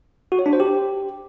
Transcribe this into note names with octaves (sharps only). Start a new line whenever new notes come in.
F#4
C#5
D4
C5
G4